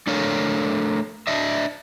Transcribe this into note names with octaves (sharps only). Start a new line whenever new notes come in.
A3 D4 A4 A#4 C#5 F5
D4 D#5 E5